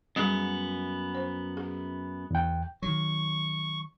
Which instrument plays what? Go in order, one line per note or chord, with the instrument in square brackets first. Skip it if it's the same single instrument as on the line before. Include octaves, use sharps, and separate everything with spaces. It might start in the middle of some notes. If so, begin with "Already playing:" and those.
[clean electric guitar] F#2 B3 [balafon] G3 G#4
[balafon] C5
G#4
[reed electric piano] E2 G5
[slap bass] D#3 F#3 [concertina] C#6